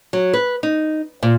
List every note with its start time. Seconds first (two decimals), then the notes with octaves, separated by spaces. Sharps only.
0.13 F#3
0.33 B4
0.63 D#4
1.23 A#2